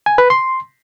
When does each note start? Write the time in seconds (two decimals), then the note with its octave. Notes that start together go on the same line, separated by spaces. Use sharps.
0.06 G#5
0.18 B4
0.30 C6